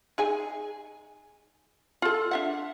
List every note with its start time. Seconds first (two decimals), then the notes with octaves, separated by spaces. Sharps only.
0.18 D#4 G#4 G#5
2.02 F4 A4
2.31 D4 E5 F#5